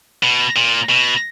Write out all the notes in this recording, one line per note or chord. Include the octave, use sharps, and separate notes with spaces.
B2
A#2
B2